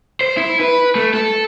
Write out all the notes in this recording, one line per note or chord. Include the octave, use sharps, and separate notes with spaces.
C5
E4
B4
A3
A4